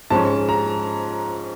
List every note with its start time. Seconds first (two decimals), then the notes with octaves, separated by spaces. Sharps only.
0.10 G#2 F3 G#3 C#4 A5
0.49 A#5